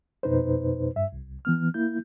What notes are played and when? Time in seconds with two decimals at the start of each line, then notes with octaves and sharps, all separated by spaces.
0.23 F2 B2 D#4 B4 C5
0.96 G2 E5
1.13 C2
1.45 E3 B3 F6
1.74 A#3 E4 G6